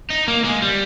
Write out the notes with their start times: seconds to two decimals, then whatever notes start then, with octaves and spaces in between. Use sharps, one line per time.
0.10 D#4
0.28 A#3
0.44 G#3
0.62 G3